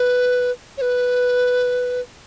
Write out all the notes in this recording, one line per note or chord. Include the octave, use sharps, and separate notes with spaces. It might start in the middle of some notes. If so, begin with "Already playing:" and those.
Already playing: B4
C#5
B4